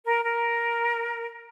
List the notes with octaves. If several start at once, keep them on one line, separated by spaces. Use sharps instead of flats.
A#4
A#4